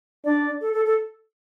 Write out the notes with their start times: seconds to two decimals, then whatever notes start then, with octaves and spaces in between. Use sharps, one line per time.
0.25 D4 D5
0.61 A4
0.73 A4
0.85 A4